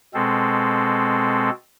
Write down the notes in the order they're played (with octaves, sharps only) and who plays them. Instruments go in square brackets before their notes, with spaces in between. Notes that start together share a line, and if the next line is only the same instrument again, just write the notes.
[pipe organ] B2 G#3 C4 A4